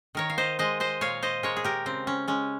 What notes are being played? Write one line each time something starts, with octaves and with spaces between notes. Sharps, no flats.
D#3 A#4 C#5
F5
C5 D#5
G#3 C5 D#5
C5 D#5
A#2 C#5 F5
C5 D#5
G#3 A#4 C#5
G#4
G4 A#4
C#3 C4
C#4
G#3 C#4